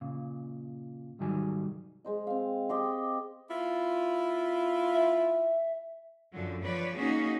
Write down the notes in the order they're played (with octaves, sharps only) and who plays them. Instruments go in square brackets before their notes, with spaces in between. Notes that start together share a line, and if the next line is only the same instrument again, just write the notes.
[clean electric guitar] A#2 C#3
C2 G#2 D#3 F#3 G3 G#5
[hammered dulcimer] G#3 C5 D#5
C4 F5
G4 D#5 C6
[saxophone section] B3 E4 F4
[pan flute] E5
[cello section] F#2 D3 F3 F#3
F3 B4 C#5 D5
A#3 C#4 D#4 F#4 G#4